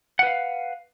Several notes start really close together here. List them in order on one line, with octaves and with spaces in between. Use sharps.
F#5 B4 F5